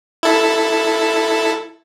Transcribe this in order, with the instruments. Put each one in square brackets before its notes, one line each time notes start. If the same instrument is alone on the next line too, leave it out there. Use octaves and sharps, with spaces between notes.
[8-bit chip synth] E4 A4